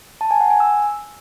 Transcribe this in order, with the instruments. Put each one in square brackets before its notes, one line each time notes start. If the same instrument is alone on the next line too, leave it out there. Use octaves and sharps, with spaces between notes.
[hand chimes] A5
G#5
F#5
G#5
E6